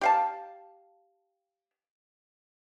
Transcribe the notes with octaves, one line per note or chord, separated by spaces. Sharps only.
G4 F5 A5